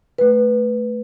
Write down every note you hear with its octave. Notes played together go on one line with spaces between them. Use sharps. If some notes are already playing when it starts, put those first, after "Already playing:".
A3 B4